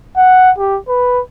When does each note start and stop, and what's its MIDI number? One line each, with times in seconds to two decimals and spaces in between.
0.17 0.51 78
0.58 0.78 67
0.89 1.21 71